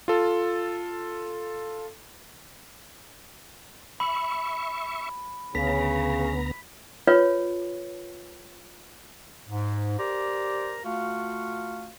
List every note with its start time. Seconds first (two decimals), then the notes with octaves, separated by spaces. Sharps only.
0.08 F4 A4
4.00 E5 B5 C#6
5.55 D2 C#3 B3 A#5 B6
7.07 F4 B4 C#5
9.49 G#2
9.98 G4 A#4 C5 D5 A#5
10.84 A3 F4 F#4 F5